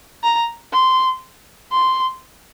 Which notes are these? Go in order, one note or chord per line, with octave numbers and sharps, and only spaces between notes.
A#5
C6
C6